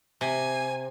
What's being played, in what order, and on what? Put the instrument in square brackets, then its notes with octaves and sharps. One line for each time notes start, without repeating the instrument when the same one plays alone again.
[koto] C3 [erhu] G#5